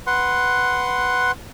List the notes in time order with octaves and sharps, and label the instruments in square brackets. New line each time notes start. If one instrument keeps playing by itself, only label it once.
[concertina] B4 F#5 C6